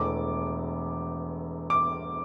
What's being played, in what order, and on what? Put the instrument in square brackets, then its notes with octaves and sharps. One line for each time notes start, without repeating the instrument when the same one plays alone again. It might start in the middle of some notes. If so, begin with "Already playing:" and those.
Already playing: [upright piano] E1 E2 E3 A3 D6
D6